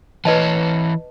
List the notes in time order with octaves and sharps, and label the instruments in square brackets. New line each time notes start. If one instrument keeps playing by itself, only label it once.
[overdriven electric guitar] E3 C#5 [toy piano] B4 D#5 A5